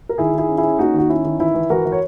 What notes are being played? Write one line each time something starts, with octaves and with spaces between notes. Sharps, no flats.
A#4
D#3 E4 G#4
D#3
E4 G#4
C#4
E4 G#4
C#4
A#3 D#4 F#4
D#3 F#4
C#4 E4
D#3
E3 E4
E3
E3 F#4 A#4
E3
C#5